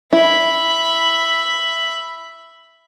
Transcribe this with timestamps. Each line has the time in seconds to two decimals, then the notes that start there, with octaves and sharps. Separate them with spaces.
0.13 E4 E5 B5